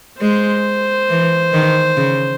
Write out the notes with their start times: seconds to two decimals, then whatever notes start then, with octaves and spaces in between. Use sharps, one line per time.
0.21 G#3 C5
1.09 E3
1.53 D#3
1.97 C#3